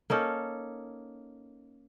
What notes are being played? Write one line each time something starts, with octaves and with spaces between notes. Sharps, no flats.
A#3 C#4 D#4 A4